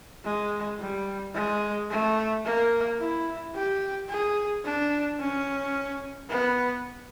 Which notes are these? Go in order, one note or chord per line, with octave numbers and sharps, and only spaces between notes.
G#3
G3
G#3
A3
A#3
E4
G4
G#4
D4
C#4
B3